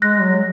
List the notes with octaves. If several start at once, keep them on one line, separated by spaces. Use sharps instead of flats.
G#3 F#6 A#6
F#3